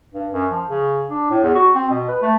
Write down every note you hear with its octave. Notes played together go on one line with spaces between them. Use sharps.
G2
F#2
F3
C#3
D4
A2
E2
F#4
C4
B2
B4
A3